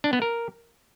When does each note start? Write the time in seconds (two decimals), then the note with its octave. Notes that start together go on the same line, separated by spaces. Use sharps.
0.04 D4
0.13 B3
0.22 A#4